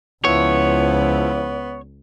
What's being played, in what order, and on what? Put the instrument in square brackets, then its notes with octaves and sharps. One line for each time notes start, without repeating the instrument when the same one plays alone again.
[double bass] C#2 [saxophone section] F3 E4 [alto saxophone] B3 [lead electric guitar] C#5